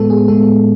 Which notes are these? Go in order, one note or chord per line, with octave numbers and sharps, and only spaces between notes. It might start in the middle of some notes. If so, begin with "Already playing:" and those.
Already playing: A2 G#3 B3 A4
G#4
A2 G#3 B3 A4